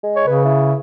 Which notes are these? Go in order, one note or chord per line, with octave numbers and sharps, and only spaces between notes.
G#3
C#5
C#3 B4
E4